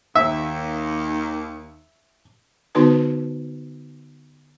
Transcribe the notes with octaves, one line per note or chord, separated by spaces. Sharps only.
D#2 E5
D3 B3 D#4 F#4 B4 A5